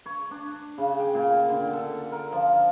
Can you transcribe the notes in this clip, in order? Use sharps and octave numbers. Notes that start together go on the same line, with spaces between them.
C#5
D4
C#3
G5
A#2
D3
A4
A#4
F3